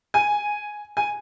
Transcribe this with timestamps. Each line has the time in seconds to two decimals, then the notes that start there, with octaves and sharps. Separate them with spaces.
0.14 G#5
0.97 G#5